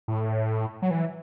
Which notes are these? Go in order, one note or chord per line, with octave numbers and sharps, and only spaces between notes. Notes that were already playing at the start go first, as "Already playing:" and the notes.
A2
F#3
E3